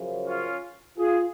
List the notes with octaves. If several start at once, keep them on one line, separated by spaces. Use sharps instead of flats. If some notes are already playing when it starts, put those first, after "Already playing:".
Already playing: F#2 C#3 F3
C#4 F4
F4 G#4